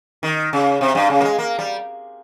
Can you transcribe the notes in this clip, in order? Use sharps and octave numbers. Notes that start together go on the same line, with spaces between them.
D#3
C#3
C3
G2
C#3
A#3
G#3
A#3
G3